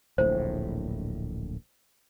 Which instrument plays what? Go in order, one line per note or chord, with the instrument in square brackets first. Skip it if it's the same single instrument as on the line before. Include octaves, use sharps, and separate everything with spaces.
[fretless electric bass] D1 A#1 A2 [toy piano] C5